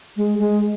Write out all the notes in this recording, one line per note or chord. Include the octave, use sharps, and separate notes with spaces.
G#3
G#3